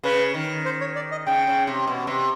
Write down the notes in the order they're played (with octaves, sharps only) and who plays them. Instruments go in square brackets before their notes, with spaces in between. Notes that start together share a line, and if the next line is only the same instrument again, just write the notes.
[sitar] C#3 [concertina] B4
[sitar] D#3
[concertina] C5
C#5
D5
D#5
[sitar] C#3 [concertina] G5
[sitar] C#3
C3
B2
C3